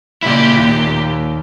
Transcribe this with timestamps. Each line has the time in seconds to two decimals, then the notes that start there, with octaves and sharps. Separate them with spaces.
0.23 A#2 C#3 E4 G4
0.57 D#2